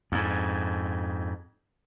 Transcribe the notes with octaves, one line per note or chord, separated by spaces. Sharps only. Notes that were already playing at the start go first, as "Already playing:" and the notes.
F2 G#2